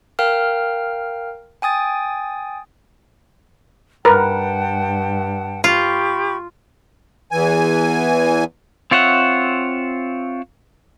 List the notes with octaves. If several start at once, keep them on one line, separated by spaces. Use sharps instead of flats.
A#4 F5 G5 F6
G5 G#5 D#6 A6
G2 A#4 B4 F#5 G5 A5
F4 G4 B5 C#6
E2 E3 G#5
C4 F4 C#5 E5 F#5